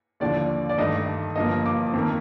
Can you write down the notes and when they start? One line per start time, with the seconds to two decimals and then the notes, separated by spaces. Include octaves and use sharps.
0.20 D#2 D3 F3 D5
0.69 D5
0.78 G2 D#3 A3 D#5
1.36 G1 G2 F3 A#3 D#5
1.66 D6
1.93 F2 D#3 A#3